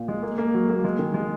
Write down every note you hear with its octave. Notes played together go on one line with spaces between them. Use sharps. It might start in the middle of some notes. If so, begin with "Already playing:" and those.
Already playing: A#2
G#3
A#3
A#3
F#3
A#3
G#3
D#3
G#3